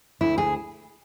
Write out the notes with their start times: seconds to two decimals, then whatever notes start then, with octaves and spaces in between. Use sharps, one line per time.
0.21 D2 E4
0.38 G#4